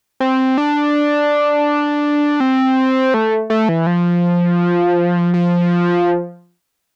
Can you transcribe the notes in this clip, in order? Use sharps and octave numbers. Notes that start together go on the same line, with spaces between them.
C4
D4
C4
A3
A3
E3
F3
F3